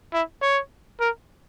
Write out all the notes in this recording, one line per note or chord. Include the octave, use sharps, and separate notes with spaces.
E4
C#5
A#4